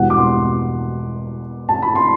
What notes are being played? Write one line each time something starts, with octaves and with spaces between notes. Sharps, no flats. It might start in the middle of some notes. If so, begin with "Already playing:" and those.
Already playing: E1 E2 B2 G3 F#5
D6
C6
A5
B5
C6